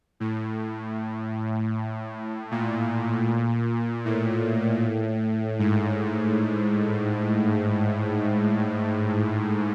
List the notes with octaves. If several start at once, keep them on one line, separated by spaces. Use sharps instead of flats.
A2
A#2
A2
G#2